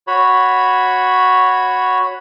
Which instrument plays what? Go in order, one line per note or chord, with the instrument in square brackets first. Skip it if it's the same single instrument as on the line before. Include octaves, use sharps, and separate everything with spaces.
[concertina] F#4 C#5 B5